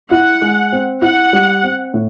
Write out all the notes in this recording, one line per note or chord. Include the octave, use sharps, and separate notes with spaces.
E4 F#5
G#3
C4
E4 F#5
G3
C4
A2